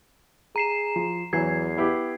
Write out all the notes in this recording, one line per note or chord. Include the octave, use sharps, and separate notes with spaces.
G#4 A#5 C7 E7
F3
E2 E3 F#3 G#6 C7
B3 E4 G4